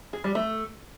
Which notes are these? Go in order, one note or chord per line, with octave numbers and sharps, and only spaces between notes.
G#4
G3
A3